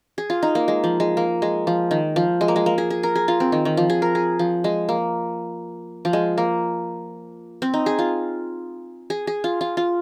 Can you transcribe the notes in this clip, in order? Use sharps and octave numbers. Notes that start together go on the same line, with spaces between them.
G#4
F4
D#4
A#3
G#3
F3
G#3
A#3
G#3
F3
D#3
F3
G#3
A#3
G#3
A#3
G#4
G#4
A#4
G#4
F4
C4
D#3
D#3
F3
G#4
A#4
G#4
F3
G#3
A#3
F3
G#3
A#3
C4
D#4
G#4
F4
G#4
G#4
F4
F4
F4